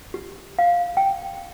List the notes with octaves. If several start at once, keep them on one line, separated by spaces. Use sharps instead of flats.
G4
F5
G5